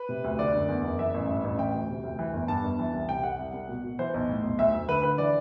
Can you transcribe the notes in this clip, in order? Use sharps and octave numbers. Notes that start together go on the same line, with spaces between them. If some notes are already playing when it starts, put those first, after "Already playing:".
Already playing: B4
C3
D2
D3 D5
F#1
E2
F#1
E3 E5
A1
G2
A1
E3 G5
D2
C3
D2
E3
G1
G2 A5
G1
E3
C2
C3 G5
C2 F#5
C2
C2
B2
B2
E3 C5
B1
A2
B1
D2 E5
D2
D3 B4
D3 B4
E3 D5